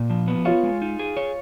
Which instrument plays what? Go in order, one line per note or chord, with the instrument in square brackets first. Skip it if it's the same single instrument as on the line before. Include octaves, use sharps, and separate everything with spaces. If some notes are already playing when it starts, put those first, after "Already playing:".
Already playing: [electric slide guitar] A#2
F3
B3
[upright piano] F4 [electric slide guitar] C#5
[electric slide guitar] G#3
D#4
G#4
C#5